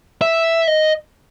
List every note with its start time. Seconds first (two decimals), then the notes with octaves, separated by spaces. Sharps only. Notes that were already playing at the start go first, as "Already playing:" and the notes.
0.21 E5
0.68 D#5